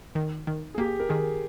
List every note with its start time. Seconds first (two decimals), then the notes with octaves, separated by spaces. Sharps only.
0.15 D#3
0.47 D#3
0.74 G#4
0.78 A#3 G4
1.00 A#4
1.09 D#3 G#4